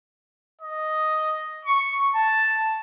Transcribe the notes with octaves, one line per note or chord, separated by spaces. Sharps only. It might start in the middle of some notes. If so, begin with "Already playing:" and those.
D#5
C#6
A5